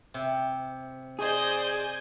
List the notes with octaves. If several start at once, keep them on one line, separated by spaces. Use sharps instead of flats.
C3
G#4 C5 D5 D#5 G#5 G6